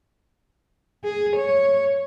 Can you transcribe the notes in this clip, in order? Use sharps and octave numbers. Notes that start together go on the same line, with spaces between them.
G#4
C#5